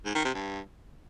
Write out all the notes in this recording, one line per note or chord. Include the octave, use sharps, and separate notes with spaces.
G#2
D#3
C3
G2